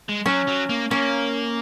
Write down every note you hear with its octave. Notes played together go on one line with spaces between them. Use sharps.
G#3
F#3 C#4
F#3
A#3
A#3 C#4